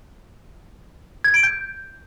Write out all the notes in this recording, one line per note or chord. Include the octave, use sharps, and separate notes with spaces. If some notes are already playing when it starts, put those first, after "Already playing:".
G#6
D7
G6